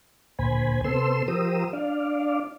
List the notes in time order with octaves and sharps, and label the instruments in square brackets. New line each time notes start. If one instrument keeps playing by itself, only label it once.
[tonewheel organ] D2 A#2 C5 G#5 B5
C3 B3 A4 C5 C6 E6
F3 G4 A#4 C5 D#6 E6
D4 D5 F5